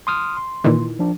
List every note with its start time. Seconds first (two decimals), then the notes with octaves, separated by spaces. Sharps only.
0.07 C6 D#6 F6
0.37 C6
0.64 A#2 D#3 E3
0.99 F3 D4